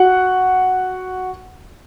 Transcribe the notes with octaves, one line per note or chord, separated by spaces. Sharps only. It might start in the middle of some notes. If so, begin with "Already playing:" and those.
Already playing: F#4 F#5